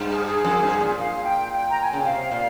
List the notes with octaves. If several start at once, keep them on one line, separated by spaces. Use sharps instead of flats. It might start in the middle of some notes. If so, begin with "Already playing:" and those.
Already playing: G2
G#4
G4
G#4
F2
G2
A#2
A#2 F5
G5
G5
A#5
G#5
C#3 G5
C3 F5
A#2 F5